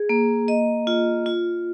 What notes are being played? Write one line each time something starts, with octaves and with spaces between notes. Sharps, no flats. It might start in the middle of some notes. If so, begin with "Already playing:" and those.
Already playing: G#4
A#3
D#5
F4
F4